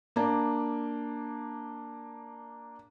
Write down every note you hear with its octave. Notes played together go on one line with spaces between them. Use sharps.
A#3 D4